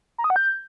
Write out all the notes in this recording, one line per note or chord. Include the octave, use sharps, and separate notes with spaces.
A#5
D#6
F#5
G6